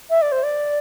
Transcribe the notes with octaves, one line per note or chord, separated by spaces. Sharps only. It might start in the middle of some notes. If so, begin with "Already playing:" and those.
E5
D5
C5
D5